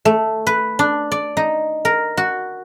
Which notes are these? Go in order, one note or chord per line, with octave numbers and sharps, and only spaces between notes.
A3
B4
D4
D5
D#4
A#4
F#4